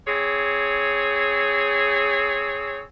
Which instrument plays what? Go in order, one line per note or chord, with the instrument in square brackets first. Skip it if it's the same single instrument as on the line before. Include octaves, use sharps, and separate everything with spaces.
[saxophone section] C4 G#4 C#5